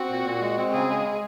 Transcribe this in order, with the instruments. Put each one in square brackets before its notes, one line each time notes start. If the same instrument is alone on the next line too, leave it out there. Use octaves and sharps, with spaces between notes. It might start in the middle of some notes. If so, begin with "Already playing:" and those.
Already playing: [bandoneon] C4 [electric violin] F#4
[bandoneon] A#2
A#2
G#3
C4
[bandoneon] C#3 [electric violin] G#4
[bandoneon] G#3